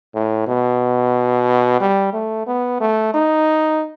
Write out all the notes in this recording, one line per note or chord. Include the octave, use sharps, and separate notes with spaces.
A2
B2
G3
A3
B3
A3
D#4